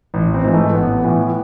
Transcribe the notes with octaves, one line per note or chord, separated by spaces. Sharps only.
A1
C4
G#2 E3
A3
A1 B3
A2 E3